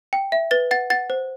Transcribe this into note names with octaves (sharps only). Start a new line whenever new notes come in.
G5
E5
B4 A6
F#5 A6
F#5 A6
C5